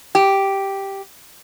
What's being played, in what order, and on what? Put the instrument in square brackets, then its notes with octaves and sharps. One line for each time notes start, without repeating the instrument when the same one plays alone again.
[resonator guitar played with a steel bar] G4